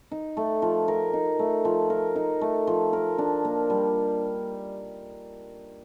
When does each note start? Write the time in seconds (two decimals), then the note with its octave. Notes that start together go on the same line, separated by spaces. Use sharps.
0.11 D#4
0.37 A3
0.62 F3
0.88 A#4
1.13 D#4
1.39 A3
1.65 F3
1.90 A#4
2.16 D#4
2.41 A3
2.67 F3
2.93 A#4
3.18 D4
3.45 A#3
3.70 G3